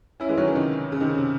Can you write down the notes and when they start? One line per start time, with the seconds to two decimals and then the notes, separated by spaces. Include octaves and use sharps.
0.20 C#4 E4
0.29 E3 G#3
0.37 D#3 F#3
0.48 C#3 E3
0.56 C3 D#3
0.92 C#3
1.01 C3 D#3
1.09 C#3
1.18 C3